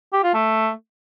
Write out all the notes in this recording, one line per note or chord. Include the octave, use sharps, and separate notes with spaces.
G4
F4
A3